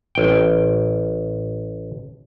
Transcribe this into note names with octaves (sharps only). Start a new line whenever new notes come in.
A1 G5